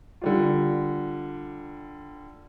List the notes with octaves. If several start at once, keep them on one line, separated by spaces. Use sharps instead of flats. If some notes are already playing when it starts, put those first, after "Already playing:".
D3 G3 F4